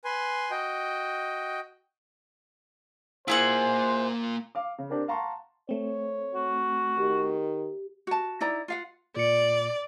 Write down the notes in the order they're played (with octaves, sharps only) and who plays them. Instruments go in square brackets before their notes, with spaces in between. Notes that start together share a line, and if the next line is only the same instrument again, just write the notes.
[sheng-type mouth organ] B4 G#5 C6
F#4 D#5 G5
[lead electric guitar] A#3 F4 [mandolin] E4 G#4 F#5 [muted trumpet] C5
[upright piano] F5 D6
C#3
C4 D4 G4 A#4
F5 F#5 A5 A#5 C6 C#6
[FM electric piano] A3 C4 [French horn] C#5
[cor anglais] F#4
[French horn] D#3 [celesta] G4
[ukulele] F#4 A5
D#4 E4 D5 A#5
F4 F5 F#5
[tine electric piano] A#2 C#7 [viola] D5